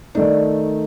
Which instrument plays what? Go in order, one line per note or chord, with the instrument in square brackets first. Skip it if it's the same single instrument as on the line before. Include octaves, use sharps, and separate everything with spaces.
[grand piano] D#3 A3 D#4 [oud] D4